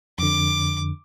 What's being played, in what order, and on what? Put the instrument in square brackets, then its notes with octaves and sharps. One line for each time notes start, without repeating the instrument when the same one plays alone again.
[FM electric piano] F2 D3 [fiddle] D6